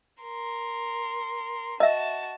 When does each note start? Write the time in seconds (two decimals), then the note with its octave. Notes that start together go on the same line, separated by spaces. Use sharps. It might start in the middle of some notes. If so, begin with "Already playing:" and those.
0.22 A#4 C6
1.80 F#4 D#5 E5 A5